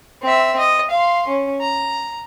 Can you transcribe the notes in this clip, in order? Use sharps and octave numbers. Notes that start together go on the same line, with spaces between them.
C4 E5
D#5
F5 C6
C#4
A#5